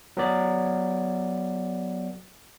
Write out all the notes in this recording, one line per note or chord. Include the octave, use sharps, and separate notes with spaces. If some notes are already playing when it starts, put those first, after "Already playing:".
F#3 B3 D5